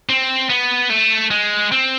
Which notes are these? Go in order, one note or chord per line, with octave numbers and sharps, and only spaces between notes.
C4
B3
A3
G#3
C4